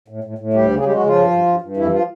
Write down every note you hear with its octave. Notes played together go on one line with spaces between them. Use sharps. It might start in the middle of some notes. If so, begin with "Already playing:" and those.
A2
A2
A2
D2 G3 G4
C#3
G#4
G3 G#3 G4
F#3 F#4
C#3
F3 F4
G2
G2
G2
G2
F2 E3 E4
F3 F4